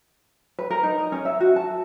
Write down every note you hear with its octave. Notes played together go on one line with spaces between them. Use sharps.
B4
A#4
D#4
D#5
C#4
E5
F#4
A5